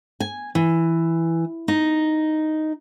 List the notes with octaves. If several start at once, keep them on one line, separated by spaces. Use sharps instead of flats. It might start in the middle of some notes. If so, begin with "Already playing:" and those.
G#5
E3
D#4